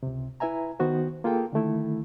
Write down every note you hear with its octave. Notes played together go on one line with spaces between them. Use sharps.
C#2 C3
E4 B4 E5 G#5 A#5
D#3 B3 F#4 C5
A#3 F4 G#4 A4 G5
D3 D#3 A3 E4